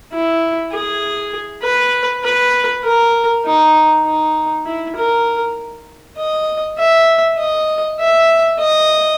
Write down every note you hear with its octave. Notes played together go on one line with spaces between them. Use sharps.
E4
G#4
B4
B4
A#4
D#4
D#4
E4
A#4
D#5
E5
D#5
E5
D#5